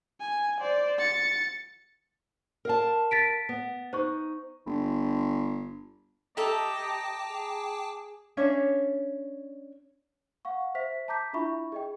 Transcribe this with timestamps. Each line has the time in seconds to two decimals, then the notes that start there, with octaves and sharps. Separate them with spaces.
0.21 G#5
0.60 C5 D5
0.99 A6 C#7
2.65 A#4 F5 A5
3.11 A6 B6 D7
3.49 B3
3.93 D#4 C5 C#6
4.66 G1
6.37 G4 A4 D#5 E5 G5 A5 A#5 D6
7.29 G#4
8.37 C#4 D4 C#5 E5
10.45 F5 F#5 C#6
10.75 C5 E5 B6
11.08 A5 A#5 D6 G6 B6
11.33 D4 E4 F4 E5 B5 C#6
11.72 G#4 D#5 G5